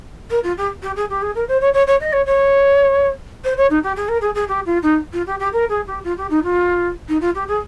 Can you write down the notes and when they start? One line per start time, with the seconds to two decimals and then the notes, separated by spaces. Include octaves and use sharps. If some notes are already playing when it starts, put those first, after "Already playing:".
0.30 A#4
0.44 F4
0.57 G4
0.82 G4
0.96 G#4
1.10 G4
1.22 G#4
1.35 A#4
1.48 C5
1.61 C#5
1.74 C#5
1.87 C#5
2.00 D#5
2.13 C#5
2.26 C#5
3.44 C5
3.57 C#5
3.70 D#4
3.83 G4
3.96 G#4
4.09 A#4
4.21 G#4
4.35 G#4
4.48 G4
4.66 F4
4.83 D#4
5.13 F4
5.26 G4
5.39 G4
5.53 A#4
5.69 G#4
5.87 G4
6.04 F4
6.17 G4
6.30 D#4
6.44 F4
7.09 D#4
7.21 F4
7.35 G4
7.48 G#4